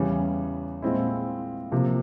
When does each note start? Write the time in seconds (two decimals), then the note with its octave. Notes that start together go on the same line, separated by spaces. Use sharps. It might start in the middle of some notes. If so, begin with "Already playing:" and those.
Already playing: E2 C#3 E3 G3 C#4
0.82 A#2 G#3 C4 E4
1.72 C3 F3 A#3